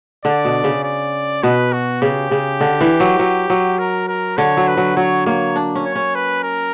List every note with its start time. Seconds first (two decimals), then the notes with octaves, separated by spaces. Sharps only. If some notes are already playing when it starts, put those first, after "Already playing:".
0.25 D3 D5
0.45 B2
0.64 C#3
0.84 D5
1.43 B2 B4
1.73 F#4
2.02 C#3 G4
2.31 C#3
2.61 D3
2.81 E3
3.00 F#3
3.19 F#3
3.50 F#3
3.79 A#4
4.08 A#4
4.38 D3 C#5
4.57 F#3
4.68 B4
4.77 F#3
4.97 F#3 C#5
5.26 A#3 C#5
5.56 D4
5.75 C#4
5.86 C#5
5.95 C#4
6.15 B4
6.44 A#4